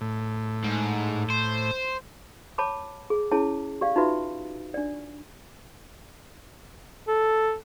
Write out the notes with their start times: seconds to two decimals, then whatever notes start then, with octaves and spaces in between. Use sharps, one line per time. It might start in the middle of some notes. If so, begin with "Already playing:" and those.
0.01 A2
0.64 G#2
1.30 C5
2.58 C#5 A5 B5 D6
3.10 G#4
3.31 C#4 E4 G#4 C#5 A5
3.81 G4 D5 F5
3.96 D#4 F4 F#4 B4 E5
4.74 D4 D5
7.08 A4